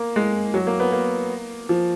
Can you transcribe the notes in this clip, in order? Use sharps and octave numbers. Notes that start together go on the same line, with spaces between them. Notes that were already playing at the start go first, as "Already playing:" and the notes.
Already playing: A#3
G#3
F#3
A#3
B3
A#3
F3